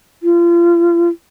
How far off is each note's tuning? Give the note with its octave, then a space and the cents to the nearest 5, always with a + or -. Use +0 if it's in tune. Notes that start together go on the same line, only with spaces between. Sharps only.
F4 -35